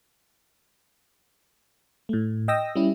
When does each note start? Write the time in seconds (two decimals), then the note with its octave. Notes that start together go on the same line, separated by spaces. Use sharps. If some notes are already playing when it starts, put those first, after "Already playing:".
2.09 A2 A3
2.48 D#5 G5 D#6 E6 A#6
2.76 G3 C#4 E4